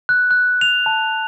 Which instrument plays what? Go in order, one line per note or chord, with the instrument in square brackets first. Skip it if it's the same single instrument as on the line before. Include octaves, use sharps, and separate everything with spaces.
[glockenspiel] F#6
F#6
F7
A5